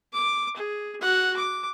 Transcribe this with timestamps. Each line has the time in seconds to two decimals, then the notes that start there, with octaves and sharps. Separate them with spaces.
0.13 D6
0.56 G#4
1.01 F#4 F#5
1.36 D6